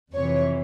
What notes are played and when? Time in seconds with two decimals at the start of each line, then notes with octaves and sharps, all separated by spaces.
0.13 F2 C3 E3 C#5